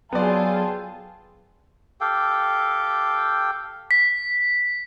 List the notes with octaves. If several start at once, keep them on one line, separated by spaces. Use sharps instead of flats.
F#3 B3 F4 G#4 A4 D5 G5 A5
G4 A4 F5 G5
B6